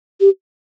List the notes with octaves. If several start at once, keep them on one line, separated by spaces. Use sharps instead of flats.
G4